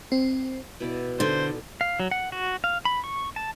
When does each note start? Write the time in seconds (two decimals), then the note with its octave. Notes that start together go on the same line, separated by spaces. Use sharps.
0.12 C4
0.80 B2 E4 D5
1.20 D3 C5
1.81 F5
2.00 F#3
2.11 F#5
2.32 F#4
2.64 F5
2.85 B5
3.04 C#6
3.36 A5